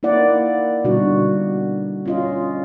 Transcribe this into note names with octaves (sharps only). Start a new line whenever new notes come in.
A#3 D#4 E4 D5 F#5
B2 D3 G3 D4 D#4 F#4
C#4 F4 D#5